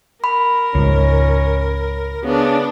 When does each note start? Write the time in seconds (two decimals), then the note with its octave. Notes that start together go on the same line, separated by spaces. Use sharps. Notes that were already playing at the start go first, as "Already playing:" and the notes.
0.24 A#4 B5
0.75 C#2 G#2 C#4
2.24 C#3 B3 D4